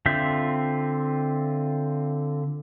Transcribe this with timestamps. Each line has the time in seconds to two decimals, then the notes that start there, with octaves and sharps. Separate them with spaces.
0.06 D3 C4 F4 E5 G6